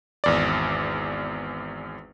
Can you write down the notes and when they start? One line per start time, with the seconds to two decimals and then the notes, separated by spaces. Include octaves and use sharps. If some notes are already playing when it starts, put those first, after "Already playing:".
0.24 G#1 E2 D5